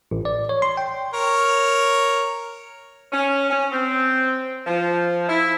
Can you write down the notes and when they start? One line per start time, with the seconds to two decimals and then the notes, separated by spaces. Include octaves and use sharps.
0.11 A1
0.25 D5
0.49 C#5
0.62 C6
0.77 G5
1.14 A#4 C#5
3.12 C#4
3.49 C#4
3.72 C4
4.67 F3
5.28 E4